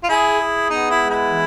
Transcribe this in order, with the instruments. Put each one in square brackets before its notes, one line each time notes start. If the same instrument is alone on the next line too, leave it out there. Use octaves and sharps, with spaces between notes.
[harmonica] F4
[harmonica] E4 [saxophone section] G#4
[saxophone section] G#4
[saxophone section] B3 [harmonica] D#4
[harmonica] E4
[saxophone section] G#3
[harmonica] E4
[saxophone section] E3